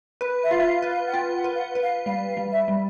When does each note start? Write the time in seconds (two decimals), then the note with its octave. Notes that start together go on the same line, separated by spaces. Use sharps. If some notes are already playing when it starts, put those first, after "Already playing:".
0.21 B4
0.44 E5
0.51 F4 F5
0.59 E5
0.67 F5
0.82 B4
0.90 F5
1.07 F#5
1.13 F4 G5
1.36 F#5
1.44 B4
1.56 F5
1.59 F#5
1.75 B4
1.83 F5
2.06 G3 F5
2.29 F5
2.37 G3
2.52 E5
2.68 G3